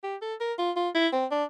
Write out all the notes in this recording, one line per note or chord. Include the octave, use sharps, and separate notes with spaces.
G4
A4
A#4
F4
F4
E4
C4
D4